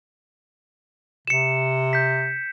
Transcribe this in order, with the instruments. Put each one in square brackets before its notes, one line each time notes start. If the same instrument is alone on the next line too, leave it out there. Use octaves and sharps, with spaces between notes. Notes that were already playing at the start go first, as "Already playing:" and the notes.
[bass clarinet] C3 [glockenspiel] C#7 E7
[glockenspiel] G6 B6